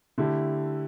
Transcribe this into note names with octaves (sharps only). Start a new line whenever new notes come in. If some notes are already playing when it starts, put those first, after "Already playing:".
D3 A3 E4 G4